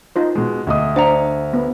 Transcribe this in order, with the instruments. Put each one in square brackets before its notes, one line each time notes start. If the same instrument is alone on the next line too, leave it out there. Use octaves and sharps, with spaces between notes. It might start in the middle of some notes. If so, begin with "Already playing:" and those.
[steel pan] D#4 F4 C5
[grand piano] B2 G#3
D2 D#5 D#6
[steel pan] D4 [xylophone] C5 F#5 A#5
[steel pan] B3